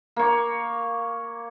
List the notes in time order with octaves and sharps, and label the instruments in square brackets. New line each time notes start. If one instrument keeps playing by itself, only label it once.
[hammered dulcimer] A#3 C#5